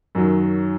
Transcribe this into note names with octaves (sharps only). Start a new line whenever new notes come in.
F#2 D#3 F#3